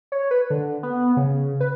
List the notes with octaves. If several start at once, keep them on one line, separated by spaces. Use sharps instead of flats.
C#5
B4
D3
B3
C#3
B4